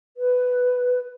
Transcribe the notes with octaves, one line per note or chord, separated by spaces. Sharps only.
B4